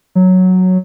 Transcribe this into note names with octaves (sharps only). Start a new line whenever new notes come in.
F#3